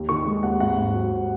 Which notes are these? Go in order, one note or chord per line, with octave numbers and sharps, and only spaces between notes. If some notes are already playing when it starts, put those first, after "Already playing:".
Already playing: D#2
D#3 C#6
G#3
D#2 F#5
G#1 F#5
G#2
F#3
G#1